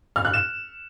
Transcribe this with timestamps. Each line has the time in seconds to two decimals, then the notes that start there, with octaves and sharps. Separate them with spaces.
0.16 F6
0.25 F#6
0.33 E7